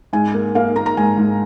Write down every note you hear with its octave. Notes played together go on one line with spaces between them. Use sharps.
G#2 G#5
A#3
A#3 F5
A#3 A#5
A#5
G#2 G#5
G#2